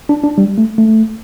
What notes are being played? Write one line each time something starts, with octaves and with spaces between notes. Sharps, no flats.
D4
D4
G3
A3
A3